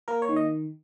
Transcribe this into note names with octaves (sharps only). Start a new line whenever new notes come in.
A#3 A#4
C#5
D#3
D#5